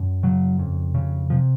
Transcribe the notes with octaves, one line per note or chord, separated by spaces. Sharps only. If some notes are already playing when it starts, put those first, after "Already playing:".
Already playing: F#2
C#3 F#3
F2
C#3
C3 F3